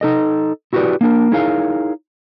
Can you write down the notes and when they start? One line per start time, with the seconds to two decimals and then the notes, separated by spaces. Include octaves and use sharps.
0.01 D#4 A4 D#5
0.73 E4 F#4 G4 A4 B4 D5
1.01 A#3 D4 A#4
1.32 D#4 E4 G#4 A#4 C#5 F5